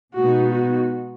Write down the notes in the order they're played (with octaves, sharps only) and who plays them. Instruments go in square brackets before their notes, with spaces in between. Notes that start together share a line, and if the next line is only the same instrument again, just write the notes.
[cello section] B2 G#3 B3 D#4 [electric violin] F#4
[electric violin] F#4